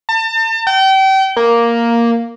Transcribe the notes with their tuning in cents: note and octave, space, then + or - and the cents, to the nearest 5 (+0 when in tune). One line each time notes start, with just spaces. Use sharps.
A5 +35
G5 -35
A#3 +0